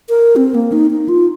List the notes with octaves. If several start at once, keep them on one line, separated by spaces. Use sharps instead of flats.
A#4
C4
A#3
D#4
D#4
F4